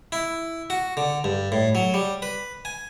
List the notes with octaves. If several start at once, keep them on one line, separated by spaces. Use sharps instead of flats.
E4
F#4
D3
G2
A2
F#3
G3
B4
G#5